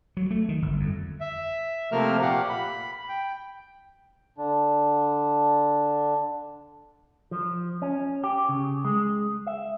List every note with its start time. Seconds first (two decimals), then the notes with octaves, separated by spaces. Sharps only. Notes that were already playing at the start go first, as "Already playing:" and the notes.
0.17 F#3
0.31 A3
0.49 D#3
0.62 G1
0.80 F2
1.20 E5
1.92 C3 F3 A3 A#3 A#4 F6
2.22 A#2 G4 F5 F#5
2.49 B5
3.09 G5
4.38 D3 D4
7.31 F3
7.82 C#4
8.24 G4
8.49 C#3
8.85 G#3
9.47 E5